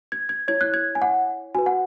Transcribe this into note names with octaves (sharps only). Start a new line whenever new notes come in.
G#6
G#6
E4 C#5 G#6
F#6
G#6
G#5
F#5
F#4 B4 G#5
F#5